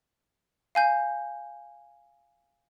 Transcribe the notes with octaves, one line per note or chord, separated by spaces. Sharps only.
F5 G#5 G6